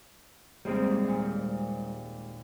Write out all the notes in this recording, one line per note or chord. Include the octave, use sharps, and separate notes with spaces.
D#2 C3 G3 G#3 A#3 C4
A#2